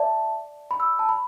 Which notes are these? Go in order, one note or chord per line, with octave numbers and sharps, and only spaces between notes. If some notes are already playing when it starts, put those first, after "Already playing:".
Already playing: D5 E5 A5
B5
E6
A5
B5